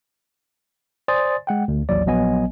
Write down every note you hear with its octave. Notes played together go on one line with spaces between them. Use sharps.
C5 D5 G#5 C6 D#6 A6
G#3 F#5 G5
D2
A1 D#2 F#3 D5
A#1 F#3 B3 D#5 G#5